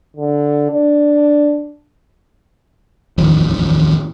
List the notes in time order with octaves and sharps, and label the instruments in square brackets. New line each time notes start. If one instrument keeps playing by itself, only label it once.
[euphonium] D3
D4
[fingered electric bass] D#1 A1 F2 D#3